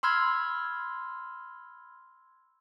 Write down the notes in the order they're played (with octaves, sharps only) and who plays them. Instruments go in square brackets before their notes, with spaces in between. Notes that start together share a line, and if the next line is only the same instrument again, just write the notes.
[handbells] B5 C6 E6 F6 G#6